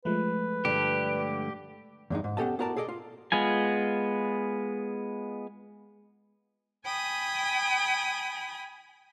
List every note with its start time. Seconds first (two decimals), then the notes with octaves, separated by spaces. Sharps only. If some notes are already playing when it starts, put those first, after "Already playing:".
0.05 F3 G#3 A3 B4
0.65 G2 D3 G4
2.10 E2 G2 G#3 D#4
2.24 G#2
2.37 B3 C#4 G4 A4 D#5 A5
2.59 B3 E4 F#4 A#4 D5 A5
2.76 G#4 A4 D5 D#5
2.88 F4
3.32 G#3 B3 F4 G#5
6.85 G5 G#5 B5 D#6